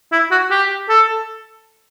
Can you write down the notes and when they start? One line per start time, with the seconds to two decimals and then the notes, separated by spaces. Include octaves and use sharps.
0.12 E4
0.31 F#4
0.51 G4
0.89 A4